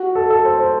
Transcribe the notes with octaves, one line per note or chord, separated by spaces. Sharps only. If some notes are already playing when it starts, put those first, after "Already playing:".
Already playing: F#4
A4
A4
C5
C5